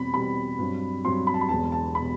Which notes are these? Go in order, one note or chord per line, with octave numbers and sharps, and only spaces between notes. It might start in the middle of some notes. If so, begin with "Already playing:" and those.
Already playing: E2 B2 G3 C4 B5
E2 B2 G3 C4 B5
G2 F#3 C4
G2 F#3 C4 C6
B5
A5
B5
E1 E2 B2 A5
A5
B2 B5